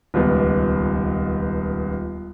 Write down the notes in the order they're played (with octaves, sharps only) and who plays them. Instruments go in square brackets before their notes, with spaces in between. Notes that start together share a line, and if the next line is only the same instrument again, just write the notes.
[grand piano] D#1 C#2 B3